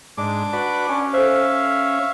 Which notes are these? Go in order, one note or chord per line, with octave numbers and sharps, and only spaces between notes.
G#2 D4 D6
F#4 B4 D5
C#4 G#5
A4 C5 E5 F5